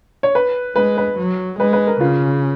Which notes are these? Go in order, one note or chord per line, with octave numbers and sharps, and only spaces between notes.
C#5
B4
G#3 B4
B4
F#3
G#3 B4
B4
A#4
C#3 F4